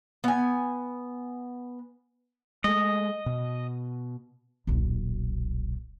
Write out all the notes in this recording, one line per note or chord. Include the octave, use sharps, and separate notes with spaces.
B3 G#5
G#3 A3 D#5
B2
D#1 B1